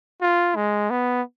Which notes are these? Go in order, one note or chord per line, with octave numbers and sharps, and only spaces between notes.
F4
G#3
B3